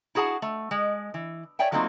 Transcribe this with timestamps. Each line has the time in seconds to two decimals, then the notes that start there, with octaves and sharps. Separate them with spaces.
0.15 E4 F#4 G#4 F#5 A5
0.42 A3
0.71 G#3
1.14 E3
1.59 C#5 D5 E5 G5 G#5
1.72 F#3 A3 A#3 C4 D#4 F4